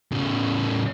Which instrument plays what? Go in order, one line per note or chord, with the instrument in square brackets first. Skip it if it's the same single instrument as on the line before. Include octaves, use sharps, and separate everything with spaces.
[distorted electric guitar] A2 C#3